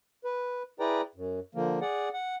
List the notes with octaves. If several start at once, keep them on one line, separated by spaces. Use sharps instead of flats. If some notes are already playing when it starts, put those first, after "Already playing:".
B4
E4 G#4 B4 D5 G5 A#5
F#2
D3 F3 A#3
G#4 D5 F#5
F#5